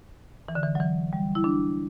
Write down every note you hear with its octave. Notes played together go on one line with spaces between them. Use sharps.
E3
D3
E3
F#3
E3
G3
E4
D4